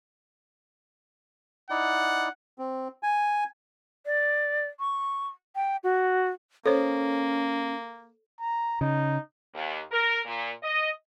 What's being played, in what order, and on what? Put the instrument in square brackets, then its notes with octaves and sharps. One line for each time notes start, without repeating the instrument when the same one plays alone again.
[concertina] D#4 E4 D5 [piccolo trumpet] F#5
[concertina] C4
G#5
[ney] D5
C#6
G5
F#4
[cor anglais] A#3 [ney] C#4 [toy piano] A4 [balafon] C5 C#5
[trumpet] A#5
[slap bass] C#3 [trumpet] D#4
[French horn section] D#2
A#4
A#2
D#5